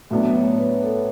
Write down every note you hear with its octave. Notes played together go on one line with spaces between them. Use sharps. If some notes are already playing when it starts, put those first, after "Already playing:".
A2 F#3 B3 D4 E5
C#5
B4
A4